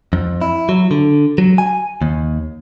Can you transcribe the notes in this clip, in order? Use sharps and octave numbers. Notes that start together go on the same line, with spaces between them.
F2
E4
F#3
D3
F#3
G#5
D#2